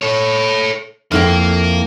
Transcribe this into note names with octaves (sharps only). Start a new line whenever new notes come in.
A4 C#5
F2 A#3 E4 G5